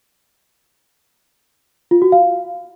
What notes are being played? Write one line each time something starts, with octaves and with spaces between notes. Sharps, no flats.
F4
F#4
F5